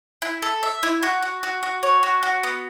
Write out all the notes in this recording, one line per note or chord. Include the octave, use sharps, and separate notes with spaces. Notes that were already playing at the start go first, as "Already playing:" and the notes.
E4
A4
E5
E4
F#4
F#4
F#4
F#4
C#5
F#4
F#4
B3